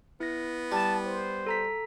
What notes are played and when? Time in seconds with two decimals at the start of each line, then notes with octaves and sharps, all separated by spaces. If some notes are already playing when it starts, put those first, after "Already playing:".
0.20 B3 E4 A#6
0.72 G3 A5
1.06 C5
1.46 A4 A#5 B6